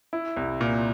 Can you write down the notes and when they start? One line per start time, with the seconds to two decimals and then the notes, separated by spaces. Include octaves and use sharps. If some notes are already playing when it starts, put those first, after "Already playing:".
0.13 E4
0.37 C2
0.61 A#2